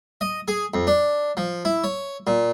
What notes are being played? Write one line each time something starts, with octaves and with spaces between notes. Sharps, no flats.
D#5
G#4
F2
D4
F3
E4
C#5
A#2